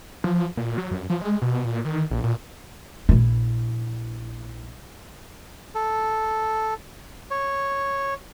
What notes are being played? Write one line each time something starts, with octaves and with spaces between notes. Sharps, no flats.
F3
A#2
F#3
F#2
F3
G#3
B2
A#2
D#3
A#1
A#2
A#1 E4
A4
C#5